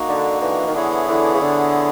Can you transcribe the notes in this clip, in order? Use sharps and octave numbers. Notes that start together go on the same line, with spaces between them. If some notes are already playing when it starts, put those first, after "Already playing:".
Already playing: A#3 D#4 F#4
D3
D3 E3
D#3
D3 E3 B3 E4 G#4 C#5
D3 E3
C#3
D3